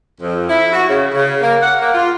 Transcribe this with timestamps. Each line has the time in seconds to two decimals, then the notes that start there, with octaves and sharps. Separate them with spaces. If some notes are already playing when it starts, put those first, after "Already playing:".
0.21 F2
0.49 E4
0.72 F#4
0.88 C#3
1.14 C#3
1.41 A#3
1.61 F#5
1.80 A#3
1.94 F4